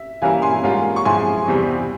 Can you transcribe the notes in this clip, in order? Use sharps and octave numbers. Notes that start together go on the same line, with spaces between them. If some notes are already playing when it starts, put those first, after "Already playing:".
Already playing: E5
E3 G3 A#3 C#4 E4 F5 G#5
G#5 C6
G#2 G3 A#3 C#4 F4
C#6
G#2 F3 G#3 E4 G#5 C6
E2 C3 E3 G3 C4